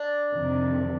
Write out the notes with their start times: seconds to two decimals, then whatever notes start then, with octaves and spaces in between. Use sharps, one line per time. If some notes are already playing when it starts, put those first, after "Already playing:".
Already playing: D4
0.32 F2 C3 D#3